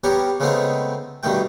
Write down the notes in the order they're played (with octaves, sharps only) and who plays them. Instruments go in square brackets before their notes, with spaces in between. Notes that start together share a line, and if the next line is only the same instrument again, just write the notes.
[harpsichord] G3 B3 G4 A#4 C#5
C#3 G#3 A3 B3 C4 D#4
G2 B2 D#3 A3 G5